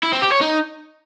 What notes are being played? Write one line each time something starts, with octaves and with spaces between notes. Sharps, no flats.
E4
C4
G4
C#5
D#4